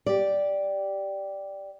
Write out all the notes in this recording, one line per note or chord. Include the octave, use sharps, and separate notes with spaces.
G4 D5